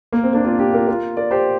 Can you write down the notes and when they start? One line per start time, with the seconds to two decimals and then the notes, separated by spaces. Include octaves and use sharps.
0.13 A#3
0.23 C4
0.33 A#3 D4
0.45 C4 F4
0.59 D4 G4
0.73 F4 A#4
0.87 F4 A#4
1.17 A#4 D5
1.31 G4 C5